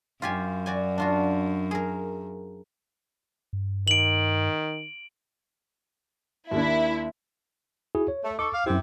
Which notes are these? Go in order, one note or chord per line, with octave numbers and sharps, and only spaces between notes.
F#2 F4 G4 G#5
F#4 D5 G#5
D4 F4 F#4
G#4 A#4
G2
D#3 D7 F#7
D#2 A#3 D4 E4
E4 F#4 G#4
C#5
A3
D#4 A4 C#6 D6
F5 D6
F#2 C3 E4